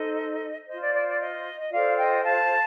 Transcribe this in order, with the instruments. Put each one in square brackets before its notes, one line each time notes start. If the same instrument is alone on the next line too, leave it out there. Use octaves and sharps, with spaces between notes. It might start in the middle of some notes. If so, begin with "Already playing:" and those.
Already playing: [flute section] D#4 A4 C5 D#5
F4 C5 D#5
D5
D5
D5
D#5
D#5
F4 A4 C5 D5 F5
D#5 G5
F5 A5